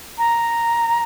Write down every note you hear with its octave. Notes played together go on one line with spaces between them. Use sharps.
A#5